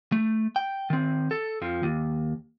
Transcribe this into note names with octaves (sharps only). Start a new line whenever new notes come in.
A3
G5
D#3 C4
A4
F2 F3
D#2